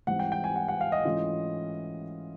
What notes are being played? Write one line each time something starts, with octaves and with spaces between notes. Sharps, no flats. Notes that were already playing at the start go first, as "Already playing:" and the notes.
G#2 E3 G3 C4 F#5
G5
G5
G#5
F#5
F#5
F5
D#5
G#2 E3 A3 C#4 F4